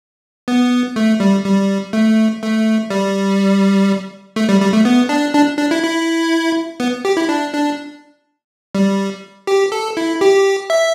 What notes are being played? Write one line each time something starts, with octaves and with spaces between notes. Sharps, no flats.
B3
A3
G3
G3
A3
A3
G3
A3
G3
G3
A3
B3
D4
D4
D4
E4
E4
B3
G4
E4
D4
D4
G3
G4
A4
E4
G4
E5